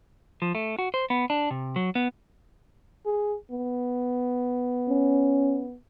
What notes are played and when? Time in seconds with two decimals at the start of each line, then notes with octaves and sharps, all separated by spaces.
0.42 F3
0.55 A3
0.79 F#4
0.94 C5
1.10 B3
1.30 D4
1.51 C3
1.76 F#3
1.95 B3
3.06 G#4
3.51 B3
4.88 C#4